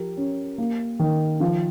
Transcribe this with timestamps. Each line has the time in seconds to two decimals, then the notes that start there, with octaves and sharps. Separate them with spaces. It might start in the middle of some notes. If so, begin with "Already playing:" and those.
Already playing: F3 G4 A#4
0.17 C#4
0.58 A#3
1.00 D#3
1.40 F3